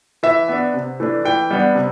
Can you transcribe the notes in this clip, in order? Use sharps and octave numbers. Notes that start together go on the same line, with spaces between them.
E3 E5
B3 D4
C3
E3 A3 D4
E3 G5
G3 B3 D4
C3